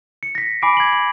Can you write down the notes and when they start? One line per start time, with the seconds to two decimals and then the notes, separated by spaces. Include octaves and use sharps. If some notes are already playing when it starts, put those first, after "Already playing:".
0.23 C#7
0.35 A#6 B6
0.62 G#5 B5 D6 C7 D7
0.77 G#6 F#7
0.93 F#7